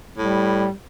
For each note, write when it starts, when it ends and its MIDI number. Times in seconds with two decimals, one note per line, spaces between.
0.18 0.65 45
0.18 0.71 55